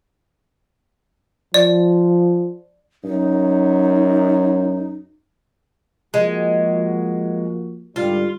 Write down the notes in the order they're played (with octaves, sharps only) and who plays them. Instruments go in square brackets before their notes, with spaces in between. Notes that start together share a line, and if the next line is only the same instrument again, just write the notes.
[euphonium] F3 [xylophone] D5
[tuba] F#2 [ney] D#4
[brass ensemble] F3 A#3 F#4 [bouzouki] G#3
[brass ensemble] G#2 D3 G3 [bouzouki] F4